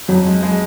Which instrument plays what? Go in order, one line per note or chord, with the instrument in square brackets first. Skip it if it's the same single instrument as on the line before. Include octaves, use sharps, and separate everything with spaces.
[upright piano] F2 [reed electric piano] F#3
[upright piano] G#3
G#3